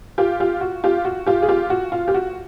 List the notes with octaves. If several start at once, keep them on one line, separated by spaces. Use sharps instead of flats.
F4 G4
F4 G4
F#4
F4 G4
F#4
F4 G4
G#4
F4 G4
F#4
F4
G4
F#4